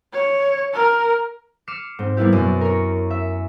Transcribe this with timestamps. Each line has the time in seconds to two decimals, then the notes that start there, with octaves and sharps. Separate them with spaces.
0.13 C#5
0.73 A#4
1.67 D6 F6 C7 C#7 D#7 E7
1.99 G#2 C4
2.17 G3 A#3 B3 E4 G4
2.32 F#2 B2
2.61 A#4 C#5
3.10 E5